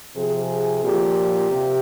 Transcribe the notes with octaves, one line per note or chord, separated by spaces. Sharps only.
C3 F3 G#4
A#2 F3 G4
C3